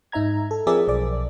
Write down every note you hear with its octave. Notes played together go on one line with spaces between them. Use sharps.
G#2 D#4 E5 A#5 G#6
A4
F3 C4 G#4 A#4 D5 E5
B1 D5 D6